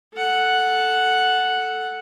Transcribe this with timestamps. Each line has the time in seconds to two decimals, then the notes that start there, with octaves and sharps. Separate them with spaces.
0.14 A4 F#5